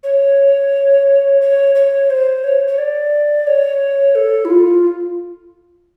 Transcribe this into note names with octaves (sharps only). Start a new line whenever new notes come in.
C#5
C#5
C#5
C5
C#5
C#5
D5
C#5
A4
E4
F4